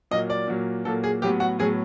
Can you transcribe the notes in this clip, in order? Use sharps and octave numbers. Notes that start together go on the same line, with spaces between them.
A#2 F#3 A#3 D#5
D5
A#2 F#3 A#3
A#2 F#3 A#3 A4
G#4
A2 F#3 B3 G4
F#4
A2 F#3 B3 G#4